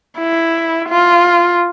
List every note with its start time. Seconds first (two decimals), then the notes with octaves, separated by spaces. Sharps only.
0.19 E4
0.89 F4